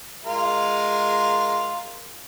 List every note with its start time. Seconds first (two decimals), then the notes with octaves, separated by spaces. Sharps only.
0.25 G#3 F4 A#4